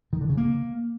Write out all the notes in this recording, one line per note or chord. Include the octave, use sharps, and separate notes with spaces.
D#3
D3
C#3
A#3